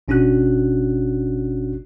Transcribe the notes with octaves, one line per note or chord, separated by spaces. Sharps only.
G1 B2 C#4 D4 F#4 F#6